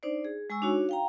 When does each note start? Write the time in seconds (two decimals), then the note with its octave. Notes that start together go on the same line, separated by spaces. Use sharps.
0.03 D4 D#4 C5 D5
0.25 G#4
0.50 G#3 G#5 C#6 E6
0.62 D4 D#4 F#4 C#5
0.89 F5 G5 A#5